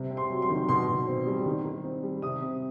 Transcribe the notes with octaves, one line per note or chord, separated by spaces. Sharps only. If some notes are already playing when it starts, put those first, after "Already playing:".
Already playing: C3 G3
C4
C6
F#3
C6
D#3
B2 C6
B2
C4
G3
D#3
D#3
C4
G3
C3 D#6
C4